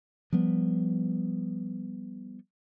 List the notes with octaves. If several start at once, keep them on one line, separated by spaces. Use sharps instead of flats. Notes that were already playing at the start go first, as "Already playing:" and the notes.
F3 G3 B3